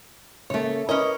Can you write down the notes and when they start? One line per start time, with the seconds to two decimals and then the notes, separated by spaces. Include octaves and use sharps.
0.50 C#3 A3 A#3 C#5
0.89 C#4 E4 A#4 B4 C#5 D#5